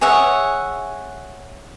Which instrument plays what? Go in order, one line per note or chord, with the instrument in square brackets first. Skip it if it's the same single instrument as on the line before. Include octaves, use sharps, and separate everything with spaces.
[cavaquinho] G#4 C#5 E5 F#5